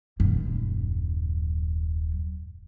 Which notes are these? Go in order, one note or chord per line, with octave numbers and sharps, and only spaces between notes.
D#1 F#2